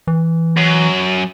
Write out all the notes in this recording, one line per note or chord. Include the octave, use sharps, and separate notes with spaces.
E3
F#2